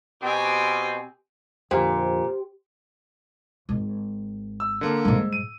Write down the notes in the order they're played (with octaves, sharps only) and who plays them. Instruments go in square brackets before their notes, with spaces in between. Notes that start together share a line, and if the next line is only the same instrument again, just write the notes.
[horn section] B2 C4 [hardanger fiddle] G4 G#5
[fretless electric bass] F2 D3 [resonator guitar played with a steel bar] A#2 [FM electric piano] G4 C5
[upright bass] G#1
[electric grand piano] E6
D3 A#3
[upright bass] G#2 G3
[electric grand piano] D#7